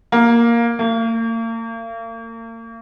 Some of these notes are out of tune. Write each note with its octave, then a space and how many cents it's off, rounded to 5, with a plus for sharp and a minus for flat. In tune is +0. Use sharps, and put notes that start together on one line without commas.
A#3 +5
A#3 -40